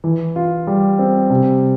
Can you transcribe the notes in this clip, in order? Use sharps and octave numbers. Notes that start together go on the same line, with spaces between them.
E3
F4
G3
C4
C3